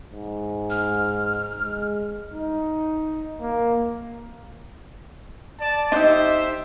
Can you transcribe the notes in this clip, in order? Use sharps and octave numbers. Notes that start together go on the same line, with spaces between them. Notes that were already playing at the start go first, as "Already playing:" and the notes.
G#2
F6
G#3
D#4
A#3
D5 A5
D4 D#4 G4 C5 D#5 E5